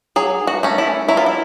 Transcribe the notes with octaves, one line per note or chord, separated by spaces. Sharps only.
F#3 G#4
F#4
A3 C#4
E4
F#3 E4
F4
E4